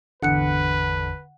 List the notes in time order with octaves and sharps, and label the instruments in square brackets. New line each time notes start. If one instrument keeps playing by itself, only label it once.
[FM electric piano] G#1 E2 [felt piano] D3 [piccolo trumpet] B4 [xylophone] F#5 F#6 C#7